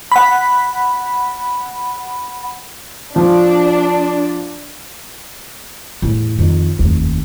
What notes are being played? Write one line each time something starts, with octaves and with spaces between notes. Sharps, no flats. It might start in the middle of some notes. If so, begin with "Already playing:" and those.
F#5 B5
F3 D4
E2 A2
F2 D#3
F1 D#2